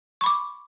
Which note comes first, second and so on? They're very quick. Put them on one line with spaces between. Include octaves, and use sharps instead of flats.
C#6 B5 D6